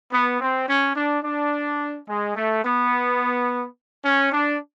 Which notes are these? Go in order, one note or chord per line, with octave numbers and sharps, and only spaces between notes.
B3
C4
C#4
D4
D4
G#3
A3
B3
C#4
D4